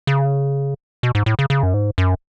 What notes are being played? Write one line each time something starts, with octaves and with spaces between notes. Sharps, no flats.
C#3
B2
G#2
A2
C#3
C#3
F#2
G#2
F#2